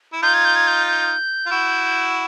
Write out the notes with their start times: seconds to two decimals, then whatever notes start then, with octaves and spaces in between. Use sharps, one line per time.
0.13 E4
0.22 D#4 F4 G6
0.34 G#6
0.45 G6
0.56 G#6
0.67 G6
0.87 G6
1.46 F4
1.51 E4 F#4